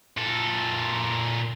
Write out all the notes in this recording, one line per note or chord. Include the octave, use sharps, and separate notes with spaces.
A#2 A4